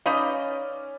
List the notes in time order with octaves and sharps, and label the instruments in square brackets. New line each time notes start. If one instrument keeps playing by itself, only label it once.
[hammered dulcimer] C#4 D5 [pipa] D#4 B4 D#5 [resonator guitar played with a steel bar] F5